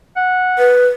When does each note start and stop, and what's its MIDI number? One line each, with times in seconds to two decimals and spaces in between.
0.16 0.68 78
0.59 0.87 71